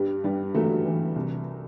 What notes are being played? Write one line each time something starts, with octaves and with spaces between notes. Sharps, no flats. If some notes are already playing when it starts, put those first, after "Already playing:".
Already playing: G2 G3
G2 G3
E3 F#3 A3
E3
C2